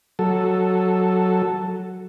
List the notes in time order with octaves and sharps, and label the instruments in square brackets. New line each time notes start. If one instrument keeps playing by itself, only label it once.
[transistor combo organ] F#3 A4